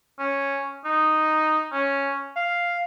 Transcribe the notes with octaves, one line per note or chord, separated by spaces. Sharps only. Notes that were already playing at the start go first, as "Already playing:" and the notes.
C#4
D#4
C#4
F5